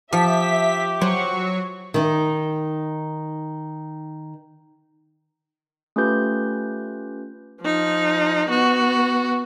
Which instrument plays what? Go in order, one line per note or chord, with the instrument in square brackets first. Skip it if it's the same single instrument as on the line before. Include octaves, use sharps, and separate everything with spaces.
[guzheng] F3 [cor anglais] G4 [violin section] E5 [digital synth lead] B6
[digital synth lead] F#3 [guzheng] C5 [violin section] C#6
[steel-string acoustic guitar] D#3 D#4
[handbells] A3 C#4 F4 G4 B4 G6
[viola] F3 D#4
B3 F#4